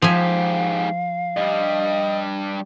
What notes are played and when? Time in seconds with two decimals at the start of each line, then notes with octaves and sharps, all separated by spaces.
0.02 G#2 F3 G4 E5 F5 G#5
1.37 G2 G3 D#5